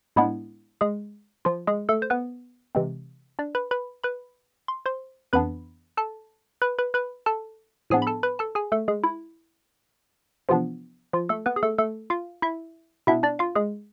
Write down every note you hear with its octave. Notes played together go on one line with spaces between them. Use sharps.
A2 G#3 B3 D4 E4
G#3 G#4
F3 F4
G#3 G#4
A3 A4
C5
B3 B4
C3 E3 G#3 C4
D4 D5
B4 B5
B4 B5
B4 B5
C6
C5 C6
F2 E3 B3 D4 B4 B5
A4 A5
B4 B5
B4 B5
B4 B5
A4 A5
A2 F3 B3 D4 G#4 G#5
B5
A4 A5
B4 B5
A4 A5
G#4 G#5
A3 A4
G#3 G#4
E4
C3 E3 F3 B3 D4 F4
F3 F4
A3 A4
B3 B4
G#4
A3 A4
A3 A4
F4 F5
E4 E5
B2 B3 D4 E4 E5
D4 D5
F4 F5
G#3 G#4